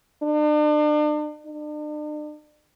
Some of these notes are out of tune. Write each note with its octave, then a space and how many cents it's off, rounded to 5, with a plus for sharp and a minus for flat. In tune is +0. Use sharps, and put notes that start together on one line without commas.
D4 +40
D4 +45